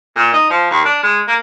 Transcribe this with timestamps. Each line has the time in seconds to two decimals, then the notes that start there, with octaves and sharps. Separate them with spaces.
0.16 A#2
0.33 D#4
0.50 F3
0.70 D#2
0.85 D4
1.03 G#3
1.27 A#3